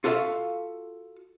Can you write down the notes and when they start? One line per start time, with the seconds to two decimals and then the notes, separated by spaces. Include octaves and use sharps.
0.04 F4 F#4 A4 C#5 E5 F5